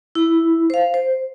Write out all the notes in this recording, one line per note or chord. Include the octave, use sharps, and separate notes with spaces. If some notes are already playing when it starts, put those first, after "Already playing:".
E4
C5 F5
C5